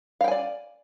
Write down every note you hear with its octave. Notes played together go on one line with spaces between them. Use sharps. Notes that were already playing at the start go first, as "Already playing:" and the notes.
D5 F5 G5 G#5